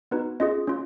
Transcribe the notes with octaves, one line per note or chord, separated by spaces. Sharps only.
B3 D#4 F#4 B4
C#4 F4 G#4 D#5
C#4 F4